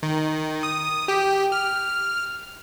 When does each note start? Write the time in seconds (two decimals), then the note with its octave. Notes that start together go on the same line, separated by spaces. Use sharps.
0.03 D#3
0.63 D#6
1.08 G4
1.52 F6